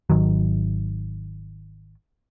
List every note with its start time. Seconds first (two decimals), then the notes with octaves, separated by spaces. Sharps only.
0.10 G#1 D#3 F#3